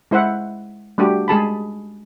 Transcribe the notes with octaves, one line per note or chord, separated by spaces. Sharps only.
G#3 E4 C5 E5 F#5
G3 A3 D4 F#4 G4
G#3 G#4 A5 B5